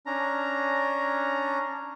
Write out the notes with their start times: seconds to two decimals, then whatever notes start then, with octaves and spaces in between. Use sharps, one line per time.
0.06 C#4 D4 A#5